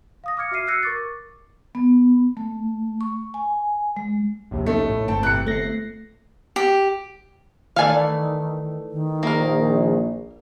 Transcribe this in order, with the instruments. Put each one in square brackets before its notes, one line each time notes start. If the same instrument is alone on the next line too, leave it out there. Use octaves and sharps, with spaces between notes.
[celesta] F5 D#6 A#6
D6 F6 G#6 C#7
F#4 E5 F6 C7 D#7
E6 F#6 G#6 A#6 C7 C#7
A#4 C#6 D6 A6
[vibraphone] B3
A3
C#6
G#5
G#3
[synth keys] A#1 D#2 C3
[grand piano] A3 [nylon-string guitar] C#4 D#4
[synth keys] A2
[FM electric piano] G1 [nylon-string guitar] A3 C4 [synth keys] G5 [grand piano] A5
[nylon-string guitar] C3 E3 A3 [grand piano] F#6 C#7
[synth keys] G1 C7 [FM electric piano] A3 A#6 [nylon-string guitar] C4
[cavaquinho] G4
[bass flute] D#3 [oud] E3 A3 D5 [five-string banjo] F5 G#5
[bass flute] D#3
[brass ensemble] A#1 [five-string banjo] A#3 A#4